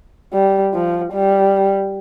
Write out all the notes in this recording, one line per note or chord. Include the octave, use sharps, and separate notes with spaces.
G3
F3
G3